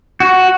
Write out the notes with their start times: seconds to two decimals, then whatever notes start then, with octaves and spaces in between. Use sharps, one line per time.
0.20 F#4